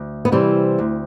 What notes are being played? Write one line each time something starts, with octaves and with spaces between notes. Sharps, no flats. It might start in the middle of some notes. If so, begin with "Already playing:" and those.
Already playing: D2
B3
C3 E3 G3 C4
D2